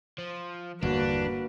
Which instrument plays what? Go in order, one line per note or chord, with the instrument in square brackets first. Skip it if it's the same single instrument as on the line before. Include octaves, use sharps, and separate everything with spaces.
[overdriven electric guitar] F3
[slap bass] G1 E2 [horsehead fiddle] A#3 B4 [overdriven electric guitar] D4 [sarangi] F#4